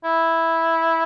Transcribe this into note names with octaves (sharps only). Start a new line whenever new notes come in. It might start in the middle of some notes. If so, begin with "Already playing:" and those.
E4